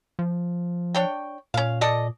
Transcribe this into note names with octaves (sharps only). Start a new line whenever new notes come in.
F3
D4 C#5 G5
A#2 C#4 F5
A4 D5 D#5